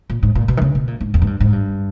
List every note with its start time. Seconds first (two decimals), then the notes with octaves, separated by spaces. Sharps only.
0.10 A#2
0.23 G#2
0.35 A#2
0.48 B2
0.57 D#3
0.62 C#3
0.75 B2
0.87 A#2
1.01 G#2
1.14 E2
1.22 G#2
1.27 G2
1.40 G#2
1.53 G2